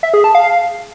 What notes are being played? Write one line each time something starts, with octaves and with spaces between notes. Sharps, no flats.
E5
G#4
A5
F5